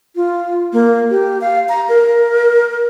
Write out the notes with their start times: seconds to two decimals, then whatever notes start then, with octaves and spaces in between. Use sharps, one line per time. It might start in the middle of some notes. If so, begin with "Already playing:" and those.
0.16 F4
0.73 A#3
1.10 G4
1.41 F5
1.69 A#5
1.89 A#4